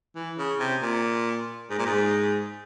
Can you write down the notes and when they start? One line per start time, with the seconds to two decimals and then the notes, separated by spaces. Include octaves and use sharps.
0.15 E3
0.38 C#3
0.59 C3
0.81 A#2
1.70 G#2
1.79 A#2
1.86 G#2